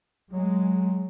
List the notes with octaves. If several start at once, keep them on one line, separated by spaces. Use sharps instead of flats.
F#3 G#3